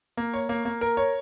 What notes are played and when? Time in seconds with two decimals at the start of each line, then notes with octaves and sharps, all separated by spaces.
0.17 A#3
0.34 C#5
0.49 A#3
0.65 A#3
0.81 A#4
0.97 C#5